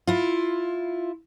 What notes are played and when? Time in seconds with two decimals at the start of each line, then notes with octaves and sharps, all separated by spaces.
0.07 E4 F4